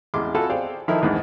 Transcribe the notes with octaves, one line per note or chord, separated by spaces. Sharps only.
A1 E2 G#3 C6 D6
F4 F#4 A4 G#5 B5
G#4 C5 D5 F5 G5
D#3 F3 D#4 E4 A4 A#4
A#1 E2 G#2